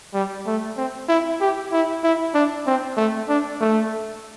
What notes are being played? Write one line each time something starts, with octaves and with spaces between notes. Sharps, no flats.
G3
A3
C4
E4
G4
E4
E4
D4
C4
A3
D4
A3